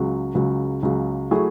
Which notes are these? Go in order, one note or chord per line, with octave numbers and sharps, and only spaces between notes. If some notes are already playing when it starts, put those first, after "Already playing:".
Already playing: C#2 C#3 F#3
C#2 C#3 F#3
C#2 C#3 F#3
F#3 A3 E4 G#4